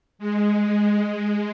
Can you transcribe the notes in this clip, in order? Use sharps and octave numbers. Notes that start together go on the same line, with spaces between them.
G#3